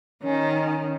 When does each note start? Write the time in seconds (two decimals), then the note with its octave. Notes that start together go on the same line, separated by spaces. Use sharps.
0.23 D#3 C#4